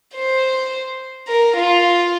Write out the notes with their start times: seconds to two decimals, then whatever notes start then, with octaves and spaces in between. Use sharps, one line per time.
0.15 C5
1.28 A#4
1.57 F4